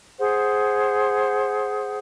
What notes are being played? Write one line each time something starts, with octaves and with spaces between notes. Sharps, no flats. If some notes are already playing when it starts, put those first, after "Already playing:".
G#4 C5 F#5